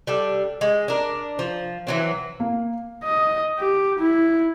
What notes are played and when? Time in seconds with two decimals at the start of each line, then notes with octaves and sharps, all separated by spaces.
0.07 G3 D4 A4
0.61 G#3
0.88 D4 A#4
1.39 F3
1.87 E3 F#3 C4
2.40 A#3
3.04 D#5
3.59 G4
3.99 E4